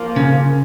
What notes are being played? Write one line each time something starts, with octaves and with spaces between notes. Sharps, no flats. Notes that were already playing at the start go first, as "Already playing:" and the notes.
Already playing: F3 A#3 F4
C#3